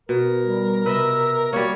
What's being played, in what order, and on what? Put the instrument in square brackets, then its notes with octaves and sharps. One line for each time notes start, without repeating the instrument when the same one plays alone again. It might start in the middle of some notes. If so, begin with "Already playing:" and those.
[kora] B2 [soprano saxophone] A#4
[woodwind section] G3
[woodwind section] C3 E6 [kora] B4 D#5 E5
[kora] G3 A#3 [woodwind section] F#4 A#4 [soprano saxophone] C#5